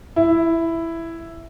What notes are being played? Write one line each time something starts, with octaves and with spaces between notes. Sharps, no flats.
E4